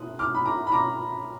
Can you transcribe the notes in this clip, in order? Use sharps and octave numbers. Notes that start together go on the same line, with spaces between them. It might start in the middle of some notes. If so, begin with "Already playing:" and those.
Already playing: D#6 F#6
D6 F6
B5
A#5 D6
B5
A#5 D6